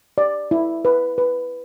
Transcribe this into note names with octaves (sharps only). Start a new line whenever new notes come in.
D5
E4
B4
B4